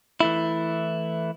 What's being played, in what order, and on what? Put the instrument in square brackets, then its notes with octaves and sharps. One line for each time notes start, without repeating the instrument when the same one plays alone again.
[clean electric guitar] E3 A3 E4